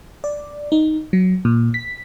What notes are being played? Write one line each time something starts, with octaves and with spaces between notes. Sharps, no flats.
D5
D#4
F#3
A#2
B6